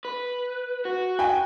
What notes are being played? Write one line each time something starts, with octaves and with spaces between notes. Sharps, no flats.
B4
F#4
G5 G#5